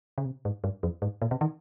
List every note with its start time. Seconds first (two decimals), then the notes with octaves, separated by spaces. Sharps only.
0.18 C#3
0.25 C3
0.45 G#2
0.64 G2
0.83 F2
1.02 G#2
1.22 A#2
1.31 C3
1.41 D#3